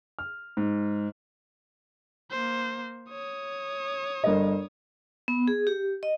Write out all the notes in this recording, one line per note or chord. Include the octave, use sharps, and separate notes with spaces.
F6
G#2
A#3 C5
C#5 D#6
G1 A#4 D#5
B3
G#4
G4
D#5